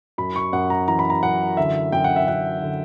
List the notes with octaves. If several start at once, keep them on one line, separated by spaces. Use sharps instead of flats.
F#2 B5
C#6
F#2 F#5
A#5
E3 A#5
B5
A#5
F#2 F#5
D3 E5
F#2 G5
F#5
E5
F#2 F#5
D3